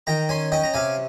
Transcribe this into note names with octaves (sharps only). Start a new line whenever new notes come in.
D#3 G5 A#5
C#4 G#5 C6
C#4 D#5 G5
A#5
C3 F5 G#5